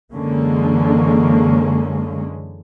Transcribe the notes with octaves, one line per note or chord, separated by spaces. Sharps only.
F#2 D3 E3 G#3 A#3 C#4